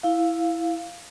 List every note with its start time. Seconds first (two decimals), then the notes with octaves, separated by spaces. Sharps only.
0.03 E4 F5